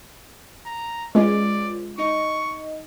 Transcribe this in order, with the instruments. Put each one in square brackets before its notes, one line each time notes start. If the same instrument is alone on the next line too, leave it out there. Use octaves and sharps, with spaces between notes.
[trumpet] A#5
[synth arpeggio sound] G#3 [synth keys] C#4 F4 B4 [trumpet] D5
[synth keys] D#4 D#5 [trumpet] C#6